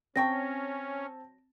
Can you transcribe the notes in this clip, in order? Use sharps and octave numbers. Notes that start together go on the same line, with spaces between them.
F#3 C4 C#4 G5 A5 C#6 A#6